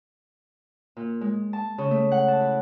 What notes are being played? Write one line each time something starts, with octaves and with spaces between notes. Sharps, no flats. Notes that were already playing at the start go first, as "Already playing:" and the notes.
A#2
G#3
A5
C#3
A3
F#5
A5
E4